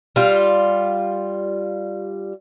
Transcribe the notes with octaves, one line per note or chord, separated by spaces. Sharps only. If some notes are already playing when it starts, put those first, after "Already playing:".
G3 F4